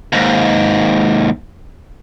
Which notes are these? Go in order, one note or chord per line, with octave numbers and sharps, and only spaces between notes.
D#2 G#2